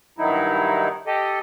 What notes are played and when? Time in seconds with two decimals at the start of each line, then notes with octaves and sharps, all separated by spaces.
0.19 G2 D#3 F#3 D#4 E4
1.07 G4 A4 D#5